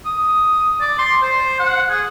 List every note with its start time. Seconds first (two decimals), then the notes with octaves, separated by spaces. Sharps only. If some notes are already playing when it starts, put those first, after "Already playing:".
0.06 D#6
0.80 D5
0.98 C6
1.22 C5
1.59 F#5
1.90 G#4